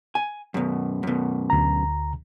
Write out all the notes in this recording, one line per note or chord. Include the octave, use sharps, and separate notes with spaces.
G#5
F#2 B2
F#2 B2
D2 A#5